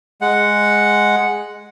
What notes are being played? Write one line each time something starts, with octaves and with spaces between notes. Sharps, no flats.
G#3 F#5